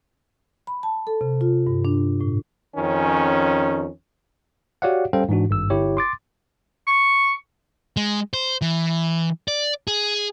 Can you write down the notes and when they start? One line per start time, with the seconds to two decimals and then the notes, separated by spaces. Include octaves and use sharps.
0.67 B5
0.83 A5
1.07 A4
1.21 C3
1.41 F4
1.67 G2
1.85 D4
2.21 A2
2.76 F2 D#3 C#4
4.82 F#4 G4 C#5 D5 F5 F#5
5.13 G3 C#4 A4 C5 F5 G5
5.29 G#2 E3 D4 F#4
5.50 G#1 G2 E6
5.70 G1 E4 G4 C#5
5.97 C6 D6 A6
6.87 C#6
7.97 G#3
8.34 C5
8.62 E3
9.48 D5
9.88 G#4